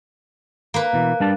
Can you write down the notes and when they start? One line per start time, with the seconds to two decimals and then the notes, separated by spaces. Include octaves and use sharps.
0.74 A#3 B4
0.93 B2 E3
1.20 G3 D4 A5